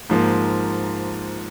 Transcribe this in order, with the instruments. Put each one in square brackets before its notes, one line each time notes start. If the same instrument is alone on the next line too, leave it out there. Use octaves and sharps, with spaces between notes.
[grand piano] G#2 F3 A#3